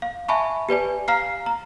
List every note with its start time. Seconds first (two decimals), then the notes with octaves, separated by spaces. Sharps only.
0.02 F5
0.28 E5 G#5 A5 B5 C#6
0.69 G4 B4 D5 G#5
1.08 F5 A#5 F6 C7
1.46 A#5